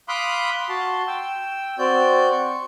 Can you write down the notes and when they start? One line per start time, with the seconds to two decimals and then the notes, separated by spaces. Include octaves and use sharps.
0.08 F5 B5 C6 D6 D#6 F#6
0.69 F#4 A5 C6
1.07 G5 E6
1.78 C4 F#4 D5 G6
2.32 C#6